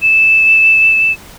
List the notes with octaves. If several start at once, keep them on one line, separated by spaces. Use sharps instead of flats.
E7